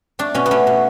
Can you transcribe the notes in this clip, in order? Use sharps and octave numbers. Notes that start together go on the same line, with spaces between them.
A3 D4
B2 C#4
B3
A3 C#4
B2